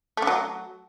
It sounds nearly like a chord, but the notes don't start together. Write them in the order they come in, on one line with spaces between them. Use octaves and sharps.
A3 D3 F#3